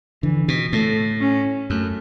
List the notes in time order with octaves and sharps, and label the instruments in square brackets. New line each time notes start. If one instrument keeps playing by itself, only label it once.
[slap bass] D3 [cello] E3
[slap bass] B2
[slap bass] A2 [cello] A3
[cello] C#4
[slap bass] F#2 [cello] A3